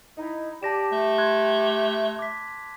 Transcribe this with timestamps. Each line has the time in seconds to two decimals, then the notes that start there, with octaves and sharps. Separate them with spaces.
0.17 D#4 E4
0.63 G4 D5 A5 A#6 E7
0.91 A3
1.18 C6 F#6 G#6
2.19 D6 B6